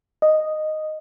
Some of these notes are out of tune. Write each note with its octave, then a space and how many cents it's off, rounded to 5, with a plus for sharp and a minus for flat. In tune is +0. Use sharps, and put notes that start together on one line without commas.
D#5 -5